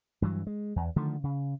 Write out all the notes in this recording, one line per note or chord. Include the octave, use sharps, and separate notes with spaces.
G2 E3 F#3
G#3
E2
D3 D#3 F3 A3
C#3